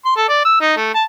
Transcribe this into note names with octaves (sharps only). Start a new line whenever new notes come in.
C6
A4
D5
E6
D#4
A3
A5